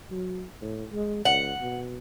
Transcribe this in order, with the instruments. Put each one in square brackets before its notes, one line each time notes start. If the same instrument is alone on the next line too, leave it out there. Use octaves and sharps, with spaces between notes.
[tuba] F#3
A2
G#3
[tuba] C#2 [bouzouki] F#5
[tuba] B2